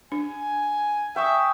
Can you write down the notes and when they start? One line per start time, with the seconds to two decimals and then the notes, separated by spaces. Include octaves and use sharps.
0.12 D4 G#5
1.16 E5 G5 G#5 C#6 D#6